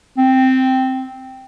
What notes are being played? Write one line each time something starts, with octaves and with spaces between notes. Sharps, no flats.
C4